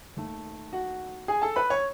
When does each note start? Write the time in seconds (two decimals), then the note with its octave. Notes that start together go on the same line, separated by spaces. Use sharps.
0.17 D#2 D#3 A3
0.73 F#4 F#5
1.28 G#4 G#5
1.42 A4 A5
1.56 B4 B5
1.70 C#5 C#6